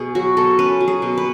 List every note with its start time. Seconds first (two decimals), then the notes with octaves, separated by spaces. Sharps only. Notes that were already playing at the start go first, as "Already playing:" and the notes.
Already playing: B2 G#4
0.15 F#3 F#4
0.37 B2 A4
0.59 C#4 B4
0.80 F#3
0.88 G#4
1.02 B2
1.18 B4